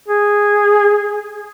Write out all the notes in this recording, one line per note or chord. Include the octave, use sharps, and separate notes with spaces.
G#4